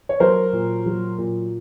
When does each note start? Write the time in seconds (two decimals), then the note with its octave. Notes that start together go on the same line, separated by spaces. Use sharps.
0.09 C#5
0.20 F#3 A#4 C5
0.53 A#2
0.86 F#3
1.18 A#2